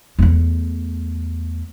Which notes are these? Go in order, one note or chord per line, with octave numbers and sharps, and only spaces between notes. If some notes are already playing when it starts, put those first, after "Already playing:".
E2 A3